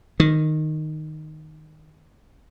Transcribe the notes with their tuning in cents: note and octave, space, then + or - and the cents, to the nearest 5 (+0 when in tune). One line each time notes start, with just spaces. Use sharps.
D#3 -5